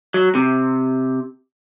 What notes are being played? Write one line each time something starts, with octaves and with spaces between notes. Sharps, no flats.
F#3
C3